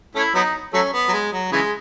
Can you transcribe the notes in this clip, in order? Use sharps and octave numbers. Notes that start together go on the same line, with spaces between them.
A3 C#4 E4
F#3 B3 D#4
F#3 A3 C#4
B3
F#3
G#3
F#3
C#3 E3 G#3